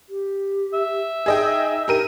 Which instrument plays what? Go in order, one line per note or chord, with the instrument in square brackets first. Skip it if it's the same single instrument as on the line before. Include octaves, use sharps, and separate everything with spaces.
[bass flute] G4
[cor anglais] E5
[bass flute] D#4 [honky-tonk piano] G#4 D#5 G5
[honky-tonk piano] G4 A#4 D#7